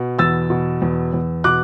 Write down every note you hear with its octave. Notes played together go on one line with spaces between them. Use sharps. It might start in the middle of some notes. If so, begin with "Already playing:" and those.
Already playing: B2
E2 E6 A6
B2
E2
E2
B2 D6 F#6